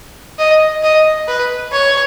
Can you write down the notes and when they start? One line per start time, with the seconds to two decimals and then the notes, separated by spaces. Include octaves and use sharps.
0.38 D#5
0.83 D#5
1.28 B4
1.72 C#5